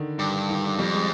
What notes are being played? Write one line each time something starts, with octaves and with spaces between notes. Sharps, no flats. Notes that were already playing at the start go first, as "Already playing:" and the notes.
Already playing: D3 D#3
G2
D#3
F2 G3
G#3